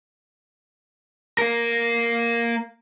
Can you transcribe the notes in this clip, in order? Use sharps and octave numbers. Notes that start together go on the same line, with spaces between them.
A#3 A#4